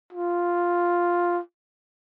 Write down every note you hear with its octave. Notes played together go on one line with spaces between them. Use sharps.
F4